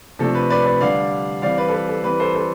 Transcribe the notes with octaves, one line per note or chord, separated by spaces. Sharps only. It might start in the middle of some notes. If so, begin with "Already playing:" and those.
C3 F3 A3 D4 A4
B4
B4 D5
B4 D5
D3 G3 D4 D5 F5
E3 G3 C4 D5 F5
B4 D5
A4
B4
A4
E3 G3 C4 B4
A4 C5
A4 C5